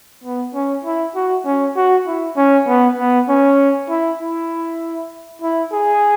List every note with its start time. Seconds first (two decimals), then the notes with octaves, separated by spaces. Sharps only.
0.24 B3
0.54 C#4
0.84 E4
1.15 F#4
1.45 C#4
1.76 F#4
2.07 E4
2.36 C#4
2.68 B3
2.98 B3
3.28 C#4
3.89 E4
4.20 E4
5.42 E4
5.72 G#4